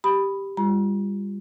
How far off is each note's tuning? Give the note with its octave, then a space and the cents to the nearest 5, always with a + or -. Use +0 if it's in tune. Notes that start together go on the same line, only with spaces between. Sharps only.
G4 +0 B5 +0 D#6 +0
G3 +30 F4 -20 A#5 +40